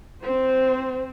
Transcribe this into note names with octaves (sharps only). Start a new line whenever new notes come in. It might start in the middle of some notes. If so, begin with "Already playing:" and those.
C4 C5